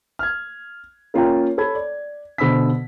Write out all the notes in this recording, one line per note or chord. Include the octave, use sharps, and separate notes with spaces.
F6 G#6
A#3 C#4 F4 F5 G5 A#5
A4 C#5 B5 G#6
D5
B2 D3 C5 B5 E6 B6